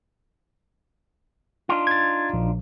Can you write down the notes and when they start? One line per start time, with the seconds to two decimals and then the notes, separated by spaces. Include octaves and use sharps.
1.69 D4 D#4 F4
1.87 G#6 A6
2.34 A#1